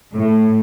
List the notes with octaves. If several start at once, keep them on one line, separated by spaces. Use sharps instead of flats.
A2